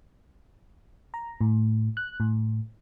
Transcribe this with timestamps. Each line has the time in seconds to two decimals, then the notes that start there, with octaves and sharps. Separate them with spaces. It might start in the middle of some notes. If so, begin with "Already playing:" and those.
1.14 A#5
1.41 A2
1.97 F#6
2.20 A2